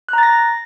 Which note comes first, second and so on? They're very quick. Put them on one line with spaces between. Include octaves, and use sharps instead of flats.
F#6 A#5 A6 A#6